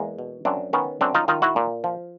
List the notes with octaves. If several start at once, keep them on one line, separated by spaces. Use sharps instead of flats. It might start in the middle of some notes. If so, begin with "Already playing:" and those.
Already playing: E2 G#3 A#3
B2
F#2 C4 D4
D#3 B3 C#4
F#2 C4 D4
D#4 F4
D#3 D#4 F4
E4 F#4
A#2
F3